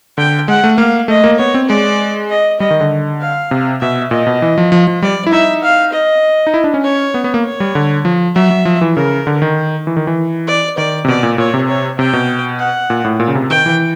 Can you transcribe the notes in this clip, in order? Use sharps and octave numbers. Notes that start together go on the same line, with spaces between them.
D3 G5
G#3 F#5
A3
A#3 F5
A3 D#5
A#3
B3 C#5
C4
G#3 D5
D#5
G3 D#5
D#3
D3
F5
C3
B2 E5
A#2 D#5
B2
E3
F3
F3
F3
G3 D5
E4
D#4 E5
F5
D#5
D#4
E4
D4
C#4
C#5
B3
B3
A#3
C#5
G3
D3
F3
F#3 E5
F#3
F3
E3
C#3 A#4
D3
D#3
E3
D#3
E3
D5
D#3 D5
C3
B2 D5
A#2
A#2 C#5
C3
C#5
C3 G5
B2
F#5
A#2
A2
A#2
C#3
C3
D#3 G5
E3